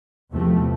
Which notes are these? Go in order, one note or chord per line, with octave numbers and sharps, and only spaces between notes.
E2 C3 F3 A3